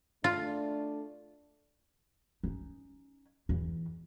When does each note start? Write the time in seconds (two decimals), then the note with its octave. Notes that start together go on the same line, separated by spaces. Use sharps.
0.24 A3 D4 F4
2.43 C#4 D#4
3.49 E2 E3